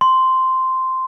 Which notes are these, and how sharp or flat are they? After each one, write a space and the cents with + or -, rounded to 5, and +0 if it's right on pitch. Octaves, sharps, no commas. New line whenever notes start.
C6 -5